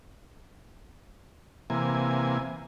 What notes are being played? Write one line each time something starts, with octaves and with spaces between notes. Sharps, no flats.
C3 E3 A#3 G#5